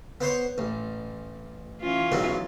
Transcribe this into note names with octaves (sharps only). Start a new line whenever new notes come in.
B3 C5 C#5
A1
E3 C#4 F4
B1 G#2 F#3